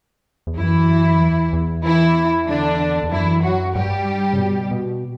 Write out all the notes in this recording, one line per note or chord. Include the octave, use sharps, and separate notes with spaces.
E2
F#2 E3 E4
E2
E2
E3 E4
D3 D4
E2
F#2 E3 E4
F#3 F#4
G2 G3 G4
C#3
B2
B2